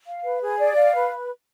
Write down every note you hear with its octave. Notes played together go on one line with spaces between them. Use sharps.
F5
B4
G#4
D5
F5
B4